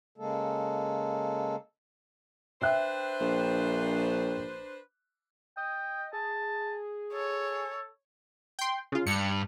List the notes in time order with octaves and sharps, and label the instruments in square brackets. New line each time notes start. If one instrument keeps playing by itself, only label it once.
[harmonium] C#3 G#3 A#3 A4
[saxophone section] D4 B4 C5 [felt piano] E5 G5 F#6
[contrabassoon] A#1
[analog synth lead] D#5 [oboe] G5
[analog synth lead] G#4 [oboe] A5
[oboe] A4 [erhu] C#5
[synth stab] G5 C6
C#3 F4
[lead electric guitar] G2 [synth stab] C#7